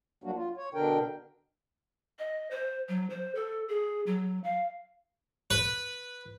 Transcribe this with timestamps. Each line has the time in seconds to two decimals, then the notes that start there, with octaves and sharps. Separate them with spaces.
0.24 F#3 G3 A#3 D4 F#4
0.36 F4
0.57 C#5
0.74 B2 D3 D4 A#4 G5
2.19 D#5
2.51 C5
2.89 F#3
3.10 C5
3.35 A4
3.68 G#4
4.06 F#3
4.44 F5
5.50 B4